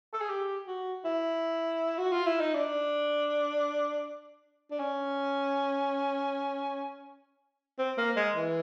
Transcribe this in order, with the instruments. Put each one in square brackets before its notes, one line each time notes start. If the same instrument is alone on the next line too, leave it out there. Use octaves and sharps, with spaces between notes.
[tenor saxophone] A4
G#4
G4
F#4
E4
F#4
F4
E4
D#4
D4
D4
C#4
C4
A#3
G#3
E3